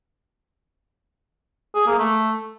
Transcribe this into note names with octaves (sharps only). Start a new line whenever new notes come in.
G#4
A#3
A3